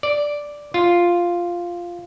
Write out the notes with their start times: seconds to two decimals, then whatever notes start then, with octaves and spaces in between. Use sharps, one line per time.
0.03 D5
0.74 F4